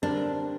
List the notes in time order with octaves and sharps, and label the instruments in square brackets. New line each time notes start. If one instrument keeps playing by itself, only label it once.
[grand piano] D3 G3 C4 A#4 [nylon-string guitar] D4